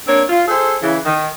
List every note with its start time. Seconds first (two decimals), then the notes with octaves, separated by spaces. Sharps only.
0.06 A#3 C4 D4 C#5
0.28 F4
0.47 G#4 A4 C5
0.83 C#3 E3
1.05 D#3